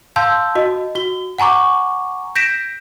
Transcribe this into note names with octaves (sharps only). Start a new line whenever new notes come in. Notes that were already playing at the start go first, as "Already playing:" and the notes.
F5 A5 C6 E6 G6
F#4 D#5
F#4 G7
F#5 G#5 A#5 C#6 D6
G6 A#6 B6 D7 E7